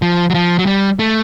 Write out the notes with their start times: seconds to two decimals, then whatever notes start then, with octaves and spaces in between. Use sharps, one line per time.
0.02 F3
0.30 F#3
0.34 F3
0.59 F#3
0.66 G3
0.99 A3